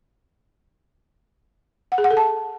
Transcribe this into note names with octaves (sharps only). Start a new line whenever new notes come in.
F#5
G#4
F#5
A4
A5